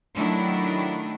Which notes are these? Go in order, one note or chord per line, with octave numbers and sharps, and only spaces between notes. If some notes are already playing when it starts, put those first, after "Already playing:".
D#3 F#3 A3 D4 E4